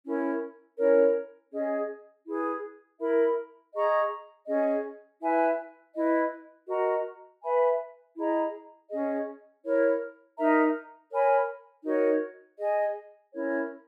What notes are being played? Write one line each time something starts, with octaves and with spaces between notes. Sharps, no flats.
C#4 E4 A#4
C#4 E4 A#4 C#5
C#4 G#4 D#5
E4 G#4 B4
E4 A#4 E5 B5
G#4 D#5 A#5 C#6
C#4 G#4 D#5
E4 B4 E5 G#5
E4 B4 D#5
F#4 A#4 D#5 A#5
B4 E5 G#5 B5
E4 G#4 D#5 A#5
C#4 G#4 D#5
E4 A#4 C#5
D#4 A#4 E5 A#5
A#4 C#5 G#5 B5
D#4 F#4 A#4 C#5
G#4 D#5 G#5
C#4 E4 A#4 C#5